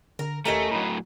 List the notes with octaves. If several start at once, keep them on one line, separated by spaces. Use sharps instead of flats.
D3 A#4
D#2 A3 C#4 D#4 G4 A#4 A#5
A2 F#3 A#5 B5